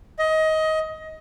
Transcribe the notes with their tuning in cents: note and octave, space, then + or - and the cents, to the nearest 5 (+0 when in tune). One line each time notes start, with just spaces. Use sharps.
D#5 +20